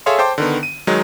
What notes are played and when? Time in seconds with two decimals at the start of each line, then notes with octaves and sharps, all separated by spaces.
0.06 G#4 A4 C#5 E5 F5 C6
0.19 C5 G5 A5 C6 D6
0.38 D3 D#3 B3
0.63 D#7
0.87 D#3 F#3 G#3 D#4